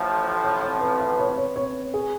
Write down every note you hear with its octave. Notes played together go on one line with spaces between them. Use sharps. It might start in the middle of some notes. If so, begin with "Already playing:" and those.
Already playing: A1 A2 F3
C#5
C#5
B4
B4
C#5
C#5
C#5
G#4